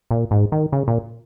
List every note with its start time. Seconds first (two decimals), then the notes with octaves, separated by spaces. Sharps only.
0.11 A#2
0.31 G#2
0.52 D#3
0.72 C#3
0.88 A#2